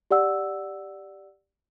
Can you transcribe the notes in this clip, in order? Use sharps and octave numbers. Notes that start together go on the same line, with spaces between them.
G4 D5 F#5 E6